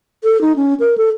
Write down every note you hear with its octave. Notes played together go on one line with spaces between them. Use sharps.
A4
D#4
C#4
A#4
A4